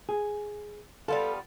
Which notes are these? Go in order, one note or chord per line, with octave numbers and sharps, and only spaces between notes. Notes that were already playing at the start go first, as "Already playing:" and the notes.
G#4
G3 B3 F4 A4